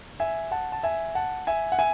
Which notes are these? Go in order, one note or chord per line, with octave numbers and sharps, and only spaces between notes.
E5 G#5
F#5 A5
A5
E5 G#5
F#5 A5
E5 G#5
F#5
E5 G#5